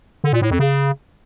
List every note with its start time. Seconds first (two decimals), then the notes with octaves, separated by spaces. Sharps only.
0.24 D3
0.33 A#2
0.42 A2
0.50 F2
0.59 C#3